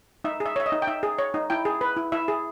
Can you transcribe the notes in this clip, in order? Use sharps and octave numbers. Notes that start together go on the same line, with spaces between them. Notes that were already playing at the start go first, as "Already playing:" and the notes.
D#4 E5
G#4
E5
C#5 E5
D#5
D#4
G5
D#4 E5
G#4
C#5
D#4
E4 G5
G#4
B4
E4
E4 E5
G#4